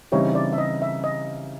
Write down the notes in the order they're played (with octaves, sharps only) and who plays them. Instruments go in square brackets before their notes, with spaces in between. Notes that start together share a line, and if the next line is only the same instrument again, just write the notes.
[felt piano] C#3 E3 G3 C4 D#4 [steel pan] C#5
[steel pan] D5
E5
D#5
E5
D#5